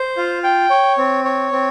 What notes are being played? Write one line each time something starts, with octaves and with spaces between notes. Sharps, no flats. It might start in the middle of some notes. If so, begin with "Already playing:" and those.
Already playing: C5
F4
G5
C#5
C4
C#5
C4